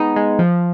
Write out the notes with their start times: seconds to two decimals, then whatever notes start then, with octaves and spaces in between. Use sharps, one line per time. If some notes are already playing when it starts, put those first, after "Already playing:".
Already playing: G#3 B3 D#4
0.16 G#3
0.39 F3